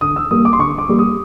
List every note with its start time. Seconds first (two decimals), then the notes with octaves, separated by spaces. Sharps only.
0.01 D3 D#6
0.16 E6
0.31 G3 A#3 D#6
0.45 D6
0.53 C6
0.59 D3 C#6
0.78 D6
0.89 G3 A#3
0.99 D#6